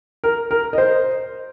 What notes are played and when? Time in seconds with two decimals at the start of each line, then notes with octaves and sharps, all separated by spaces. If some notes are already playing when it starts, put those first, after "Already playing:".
0.24 A#4
0.51 A#4
0.73 D#5
0.78 C5